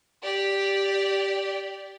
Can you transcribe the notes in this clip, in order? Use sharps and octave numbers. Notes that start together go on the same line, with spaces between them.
G4 D5